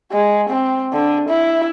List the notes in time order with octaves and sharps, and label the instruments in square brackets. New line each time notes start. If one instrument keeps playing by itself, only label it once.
[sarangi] G#3
C4
D3
E4